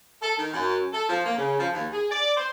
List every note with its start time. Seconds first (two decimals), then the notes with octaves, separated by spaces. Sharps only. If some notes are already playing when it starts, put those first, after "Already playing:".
0.22 A4
0.38 D#3
0.53 F#2
0.93 A4
1.09 F3
1.25 A#3
1.37 C#3
1.59 F3
1.74 D#2
1.92 G#4
2.11 D5
2.36 C5